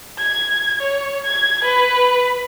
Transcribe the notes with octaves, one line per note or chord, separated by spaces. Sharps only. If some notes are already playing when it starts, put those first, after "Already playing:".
G#6
C#5
G#6
B4